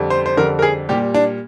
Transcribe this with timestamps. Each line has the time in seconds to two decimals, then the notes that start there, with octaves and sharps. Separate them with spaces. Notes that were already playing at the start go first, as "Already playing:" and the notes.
Already playing: F2 D3 G3
0.10 C5
0.26 C5
0.37 F2 D3 G3 A#4
0.59 A#4
0.62 G#4
0.89 A#2 G3 G4
1.14 D4